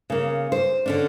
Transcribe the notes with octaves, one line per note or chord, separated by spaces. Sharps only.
C#3 A#3
C5
D3 C#4 D4